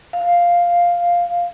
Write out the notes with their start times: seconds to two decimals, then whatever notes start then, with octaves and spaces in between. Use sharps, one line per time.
0.13 F5